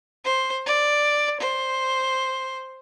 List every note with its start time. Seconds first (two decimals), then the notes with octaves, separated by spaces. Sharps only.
0.25 C5
0.66 D5
1.40 C5